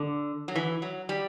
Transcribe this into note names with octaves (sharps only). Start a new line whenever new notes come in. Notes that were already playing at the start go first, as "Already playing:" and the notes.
Already playing: D3
F#3
E3
F#3
G3